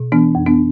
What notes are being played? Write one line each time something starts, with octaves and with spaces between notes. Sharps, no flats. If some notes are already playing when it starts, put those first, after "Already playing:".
Already playing: B2
E3 B3 D4
F2
B3 D4